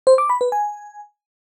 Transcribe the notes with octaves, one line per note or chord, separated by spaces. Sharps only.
C5
D6
B5
B4
G#5